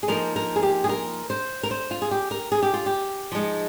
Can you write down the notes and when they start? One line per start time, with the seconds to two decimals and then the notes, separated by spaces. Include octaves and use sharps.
0.03 G#4
0.08 F3 A#3 D#4 A#4
0.36 A#4
0.56 G#4
0.63 G4
0.84 G#4
0.89 A#4
1.30 C5
1.63 A#4
1.71 C5
1.91 F4
2.02 G#4
2.11 G4
2.31 A#4
2.52 G#4
2.62 G4
2.74 F4
2.86 G4
3.32 F3 G#3 D#4